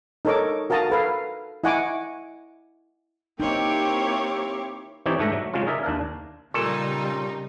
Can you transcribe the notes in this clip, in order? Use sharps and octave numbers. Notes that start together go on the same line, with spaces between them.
D#4 A4 A#4 C#5 D#5 D6
F#4 A#4 F5 A5 A#5 D#6
A4 B4 F5
E4 D#5 F#5 G#5 C#6 D6
A#3 C4 D#4 E4 G4 C#5 G5
E3 C4 D#4 G4 C#5 D5
G#2 A3 D4 E5 A#5
F#3
C#3 F#3 G#3 C#4 F4
D#4 G#4 A#4 D5 E5
D#2 D4 A#4 F5
A#2 C#3 G3 D#4 A4